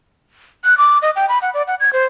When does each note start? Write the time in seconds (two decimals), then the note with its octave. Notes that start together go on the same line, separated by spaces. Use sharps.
0.64 F#6
0.78 D6
1.02 D#5
1.16 G5
1.29 B5
1.42 F#5
1.54 D5
1.67 F#5
1.80 G#6
1.93 C5